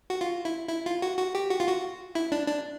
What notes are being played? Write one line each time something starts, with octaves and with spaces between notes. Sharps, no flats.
F#4
F4
E4
E4
F4
F#4
F#4
G4
F#4
F4
F#4
E4
D4
D4